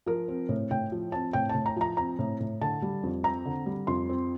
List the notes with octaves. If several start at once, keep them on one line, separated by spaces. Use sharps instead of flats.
F3 A#4
C4
A2
A2 G5
F3
C4 A5
A2 G5
A5
A2
A#5
F3 A#5
C4 A#5
A2
A2
D3 A5
G3
F2
C4 A#5
D3
G3
F2 C6
C4